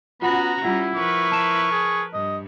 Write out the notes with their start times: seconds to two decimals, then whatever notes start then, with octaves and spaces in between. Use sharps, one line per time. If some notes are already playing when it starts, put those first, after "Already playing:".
0.22 B3 C#4 F4 F#4 F#5 A#5 B5
0.64 G3 C#4 E4 F4 F#5
0.96 F3 A#4 B4 C#6
1.32 A5 E7
1.72 G#4
2.14 G2 D#5